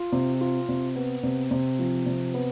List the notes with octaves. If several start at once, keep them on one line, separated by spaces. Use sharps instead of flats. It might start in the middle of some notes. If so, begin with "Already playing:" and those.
Already playing: F4
C3
F4
C3
B3
C3
C3
F3
C3
B3